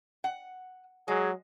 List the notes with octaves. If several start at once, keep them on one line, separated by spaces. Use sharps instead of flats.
F#5
F#3 G#3 G#4